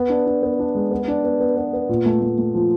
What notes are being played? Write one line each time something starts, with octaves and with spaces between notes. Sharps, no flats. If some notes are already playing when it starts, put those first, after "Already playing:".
Already playing: B3
D4
D4
B3
D4
G#3
B3
D4
B3
B3
B3
B3
A#2
A3
A3
A3
F3